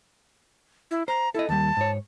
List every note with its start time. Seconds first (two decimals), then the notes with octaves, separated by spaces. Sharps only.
0.91 E4
1.08 C5 A#5
1.35 E4 A4 D#5
1.49 D#2 G3 A5
1.77 G#2 C#5